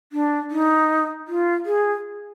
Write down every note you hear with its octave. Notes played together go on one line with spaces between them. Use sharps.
D4
D#4
F4
G#4